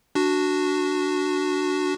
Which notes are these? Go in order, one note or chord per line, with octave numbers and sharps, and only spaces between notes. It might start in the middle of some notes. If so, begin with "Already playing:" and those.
D4 F#4